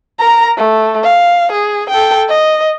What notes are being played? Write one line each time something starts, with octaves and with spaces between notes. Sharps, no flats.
A#4 A#5
A3
F5
G#4
A4 G5
D#5